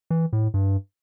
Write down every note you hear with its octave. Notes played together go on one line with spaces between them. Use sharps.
E3
A2
G2